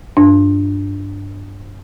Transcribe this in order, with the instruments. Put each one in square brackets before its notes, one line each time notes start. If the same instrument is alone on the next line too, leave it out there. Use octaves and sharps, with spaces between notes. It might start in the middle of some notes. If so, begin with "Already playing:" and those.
[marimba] G2 D4